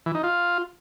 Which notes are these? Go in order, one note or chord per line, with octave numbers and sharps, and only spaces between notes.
E3
D#4
F4